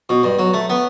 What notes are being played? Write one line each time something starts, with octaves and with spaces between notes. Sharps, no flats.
B2
G2
F#3
A3
B3